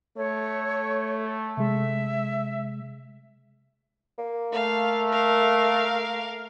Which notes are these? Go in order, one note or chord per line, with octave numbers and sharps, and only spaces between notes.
A3 C#5
C3 G#3 E5
A#3
A3 F5
A#4 F5